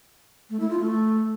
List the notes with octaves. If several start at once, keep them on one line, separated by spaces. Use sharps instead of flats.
A3
E4
F4
A3